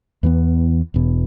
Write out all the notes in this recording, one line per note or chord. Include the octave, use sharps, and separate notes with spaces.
E2 E3 B3
E1 E2 B2